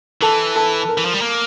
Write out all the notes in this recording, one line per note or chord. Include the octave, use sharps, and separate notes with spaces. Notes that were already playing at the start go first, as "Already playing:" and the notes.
E3 A4
A4
A#4
E3
F3
G3
A#3